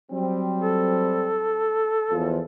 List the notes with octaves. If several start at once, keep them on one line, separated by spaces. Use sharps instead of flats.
F#3 G3 C4
A4
E2 F3